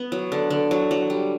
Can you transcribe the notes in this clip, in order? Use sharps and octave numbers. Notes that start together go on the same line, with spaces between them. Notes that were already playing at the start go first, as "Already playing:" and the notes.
Already playing: B3
F#3
D3
D3
F#3
F#3
G3